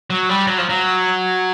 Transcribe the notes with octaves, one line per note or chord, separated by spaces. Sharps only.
F#3
G3
F#3
F3
F#3